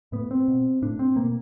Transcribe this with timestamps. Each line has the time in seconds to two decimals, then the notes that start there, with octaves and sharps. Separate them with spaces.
0.12 A2 B3
0.31 C4
0.48 B2
0.82 A2 D4
0.99 C4
1.16 B2 A#3